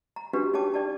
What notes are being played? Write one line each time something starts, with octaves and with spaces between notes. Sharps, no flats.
A#5
C#4 D4 F#4 G4 B4
D#4 G#4 C#5 G5 A5 D6
D#4 D5 G5 A5